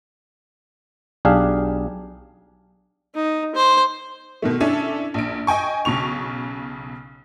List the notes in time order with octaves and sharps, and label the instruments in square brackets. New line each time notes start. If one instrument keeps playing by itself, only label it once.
[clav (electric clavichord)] B1 D4 G4 G#4 F5
[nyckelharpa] D#4
C5
[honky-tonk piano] B2 D#3 A3
C#4 D4 E4 A4
A#1 D7
D#5 G5 G#5 C#6
B1 C#3 C#6 F7